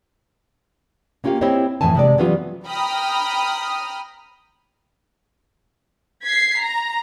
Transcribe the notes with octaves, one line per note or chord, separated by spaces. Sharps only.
A#3 C#4 F4 G4 F5
C4 E4 G4 C5 C#5 D#5
F2 A2 E3 G#5 A5
C3 G#3 D5
E3 F#3 G3 B3 C#4 F4
G5 A#5 B5 D#6 F6
G#6 B6 C7
A#5